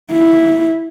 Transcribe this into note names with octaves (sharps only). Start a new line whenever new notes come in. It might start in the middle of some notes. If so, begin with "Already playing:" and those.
E4